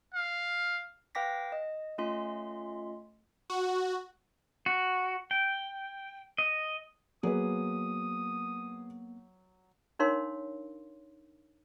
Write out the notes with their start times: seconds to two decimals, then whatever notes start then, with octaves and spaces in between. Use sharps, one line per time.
0.14 F5
1.15 B4 F5 G5 D6 A#6 B6
1.52 D#5
1.98 A3 C#4 F4 D#5 C6 B6
3.50 F#4
4.66 F#4
5.31 G5
6.38 D#5
7.23 F#3 A#3 B3 G#4 B4 D#6
9.99 D4 D#4 A#4 C#5 F5 C6